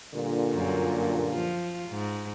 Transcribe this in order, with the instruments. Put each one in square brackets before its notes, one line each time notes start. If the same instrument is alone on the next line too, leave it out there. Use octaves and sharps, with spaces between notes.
[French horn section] G2 A#2 D3
[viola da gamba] F#2
F3 F4
G#2